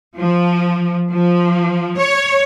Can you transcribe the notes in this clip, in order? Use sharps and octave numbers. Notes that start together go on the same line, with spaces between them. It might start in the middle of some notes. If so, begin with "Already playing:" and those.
F3
F3
C#5